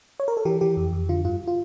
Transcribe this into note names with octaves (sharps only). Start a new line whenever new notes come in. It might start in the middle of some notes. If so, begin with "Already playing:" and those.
C#5
A#4
A4
E3 G4
E3 G4
F2
F2
D3 F4
G2 F4
F4